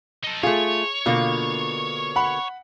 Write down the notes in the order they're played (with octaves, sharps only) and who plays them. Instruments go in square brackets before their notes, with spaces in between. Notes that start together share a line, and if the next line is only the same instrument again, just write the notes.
[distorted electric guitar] D#4 A4
[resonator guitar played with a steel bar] A3 F4 [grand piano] G#4 [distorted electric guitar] C#5
[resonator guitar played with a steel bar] B2 D3 A#3 [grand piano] F4
[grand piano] F#5 B5